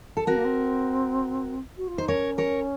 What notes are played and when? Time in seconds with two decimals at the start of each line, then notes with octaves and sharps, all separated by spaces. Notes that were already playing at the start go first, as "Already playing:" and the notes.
0.17 A4
0.27 C4 F#4 A#4
0.36 A#3
0.44 C4
1.77 F#4
1.87 F4
1.98 D#4 C5
2.08 C#4 A#4 C#5
2.38 A#4 C#5